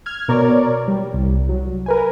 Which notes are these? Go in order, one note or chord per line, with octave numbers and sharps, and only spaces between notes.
F6 G#6
B2 A#4 C#5 D5
G3
C2
F#3
A#4 B4 G#5